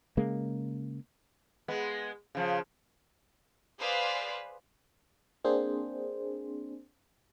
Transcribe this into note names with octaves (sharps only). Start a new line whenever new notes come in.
C#3 G#3 A#3
G#3 B3
C#3 F3
G#4 B4 C5 D5 F5
A#3 C4 D4 G#4 C5